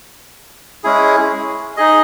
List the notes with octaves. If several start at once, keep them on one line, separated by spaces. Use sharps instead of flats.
G#3 C#4 E4 G#4
D#4 G#4 D#5